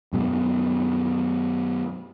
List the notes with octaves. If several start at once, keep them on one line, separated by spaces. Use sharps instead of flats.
F#2 B2 G#3